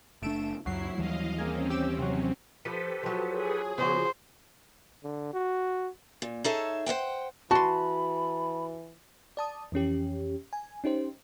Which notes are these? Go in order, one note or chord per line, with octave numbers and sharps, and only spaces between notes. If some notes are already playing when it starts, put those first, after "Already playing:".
F#1 A3 D4 D7 E7
C#2 F#2 F#3 E4 C7
D#2 E3 G3 D#5 F5
A#3 C4 C#4 G#4
G4 D6 E6
C3 F#3
F3 G4 A4 B4
F3 F#3
G#4
C#3 F3 B3 F#4 C5
D3
F#4
A#2
D#4 G#4 A4 C#5 E5
C5 D#5 F#5 G5
E3 F#4 A5 B5 C6
D5 A5 D#6
F2 E3 C#4 G4
G#5
C#4 D#4 G4 C5